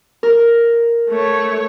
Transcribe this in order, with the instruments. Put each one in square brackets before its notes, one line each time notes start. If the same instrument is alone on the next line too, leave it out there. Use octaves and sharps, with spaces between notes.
[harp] A#4
[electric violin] A3 C#5